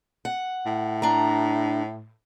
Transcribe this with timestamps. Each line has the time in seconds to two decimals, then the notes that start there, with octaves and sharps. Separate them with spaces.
0.25 F#5
0.66 A2
1.02 D4 A#5